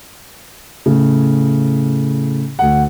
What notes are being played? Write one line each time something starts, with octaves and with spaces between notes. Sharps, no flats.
A2 C#3
D2 F#5